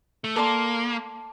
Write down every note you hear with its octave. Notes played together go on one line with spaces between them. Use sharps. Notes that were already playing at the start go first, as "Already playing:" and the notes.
A3
A#3 A4 D5 A5 C6